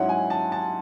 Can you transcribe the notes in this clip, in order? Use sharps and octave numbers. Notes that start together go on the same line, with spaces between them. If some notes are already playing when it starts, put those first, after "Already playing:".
Already playing: G#2 F#3 C#4 E4 F#5
G#5
A5
A5